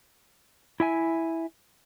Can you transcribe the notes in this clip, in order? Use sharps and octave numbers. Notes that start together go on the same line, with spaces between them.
E4 E5 G#5